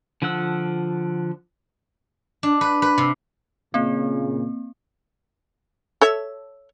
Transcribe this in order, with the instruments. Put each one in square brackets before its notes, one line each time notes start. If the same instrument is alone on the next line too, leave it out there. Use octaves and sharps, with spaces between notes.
[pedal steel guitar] D3 F3 F4 F#5 E6
[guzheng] D4
B4
B4
C3
[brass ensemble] A#2 C#3 [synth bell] A#3 C4
[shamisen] A4 C#5 E5